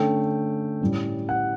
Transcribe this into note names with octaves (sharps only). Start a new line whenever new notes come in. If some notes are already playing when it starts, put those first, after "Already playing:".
Already playing: D3 A3 C#4 G5
A2 G3 C#4
F#5